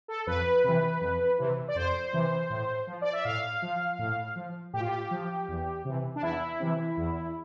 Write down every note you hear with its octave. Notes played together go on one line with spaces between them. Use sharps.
A4
F2 B4
C3 E3
F2
C3 E3
D5
F2 C5
C3 E3
A2
F3
D5
E5
A2 F5
F3
A2
F3
A2 G4
F4
G4
F3
E2
C3 E3
D4
E2 E4
C3 E3
E2